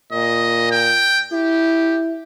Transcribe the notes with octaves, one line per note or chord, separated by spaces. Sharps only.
A#2 D#5
G5
E4 G4